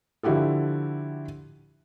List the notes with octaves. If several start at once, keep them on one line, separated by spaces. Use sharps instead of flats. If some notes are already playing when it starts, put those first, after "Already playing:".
D3 F3 E4 F#4 G4 A4